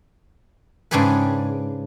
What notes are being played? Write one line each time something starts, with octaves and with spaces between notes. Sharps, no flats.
G#2 C#3 D4 G4 G#4 B4